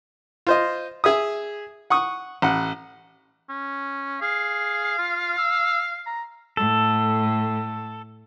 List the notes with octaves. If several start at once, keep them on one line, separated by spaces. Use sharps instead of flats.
F4 C5 D#5
G#4 E5 D#6
F#5 C#6 D#6
A1 F#5
C#4
G#4 F5
F4
E6
A#5
A2 A4